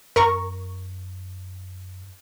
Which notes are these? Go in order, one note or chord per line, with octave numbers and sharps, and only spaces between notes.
F#2 A#4 A#5 C#6